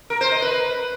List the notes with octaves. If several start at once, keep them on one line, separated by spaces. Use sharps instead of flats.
A#4
C5
D#5
B4